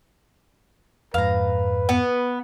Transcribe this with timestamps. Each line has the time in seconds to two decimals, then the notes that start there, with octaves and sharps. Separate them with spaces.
1.14 F2 G#2 B4 F5 A#5
1.89 B3